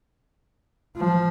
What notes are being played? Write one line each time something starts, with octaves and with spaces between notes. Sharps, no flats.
F3